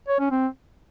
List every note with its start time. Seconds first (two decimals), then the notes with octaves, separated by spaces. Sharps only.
0.08 C#5
0.20 C#4
0.31 C4